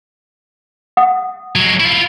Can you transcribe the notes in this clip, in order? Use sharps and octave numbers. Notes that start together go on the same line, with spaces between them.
F#5 D#6
F#3 G#3
E4 F4